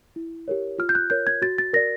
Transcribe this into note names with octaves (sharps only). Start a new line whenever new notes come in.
E4
G4 A#4 C#5
F4 F6
G6
F#6
A#4 C#5 G6
G#6
F#4 A6
A6
A#4 D5 A#6